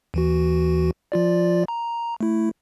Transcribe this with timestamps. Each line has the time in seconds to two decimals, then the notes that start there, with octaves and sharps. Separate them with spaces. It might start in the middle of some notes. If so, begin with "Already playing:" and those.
0.14 D#2 E3 F#4
1.12 F3 F4 D5
1.68 A#5
2.21 A3 E4